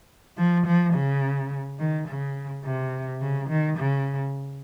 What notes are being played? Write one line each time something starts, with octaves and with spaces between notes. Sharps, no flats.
F3
F3
C#3
D#3
C#3
C3
C#3
D#3
C#3